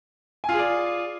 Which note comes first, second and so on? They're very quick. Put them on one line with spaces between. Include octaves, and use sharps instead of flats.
G#5 F4 G#4 D5